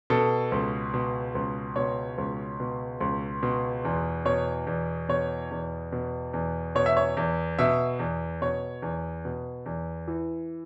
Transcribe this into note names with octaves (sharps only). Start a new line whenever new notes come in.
B2 A4
C#2
B2
C#2
B2 C#5
C#2
B2
C#2
B2
E2
B2 C#5
E2
B2 C#5
E2
B2
E2
B2 C#5
E5
C#5
E2
B2 E5
E2
B2 C#5
E2
B2
E2
E3